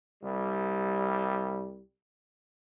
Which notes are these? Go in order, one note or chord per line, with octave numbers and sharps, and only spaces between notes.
C2 G3